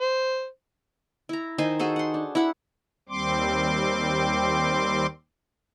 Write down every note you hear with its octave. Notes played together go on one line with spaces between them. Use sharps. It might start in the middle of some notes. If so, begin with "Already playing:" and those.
C5
E4 A#5
D#3 D#4 C5 G#5
F#4 G#4 A4 C5
F#5 C6
D4
E4 F#5 B5
D#2 G3 C4 C6 D6